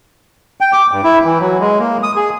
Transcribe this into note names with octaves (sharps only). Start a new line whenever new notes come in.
G5
D6
G2
E4
E3
F#3
G#3
A#3
D#6
G#4